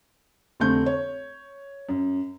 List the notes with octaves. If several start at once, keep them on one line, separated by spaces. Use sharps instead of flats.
F1 D3 A3 C4 G6
C#5
F#2